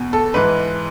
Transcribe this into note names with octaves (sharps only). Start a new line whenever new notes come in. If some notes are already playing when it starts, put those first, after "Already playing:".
Already playing: E2 B2
A4
G#2 E3 B4